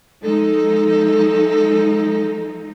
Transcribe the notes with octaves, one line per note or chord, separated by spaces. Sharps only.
F3 G#3 D#4 A4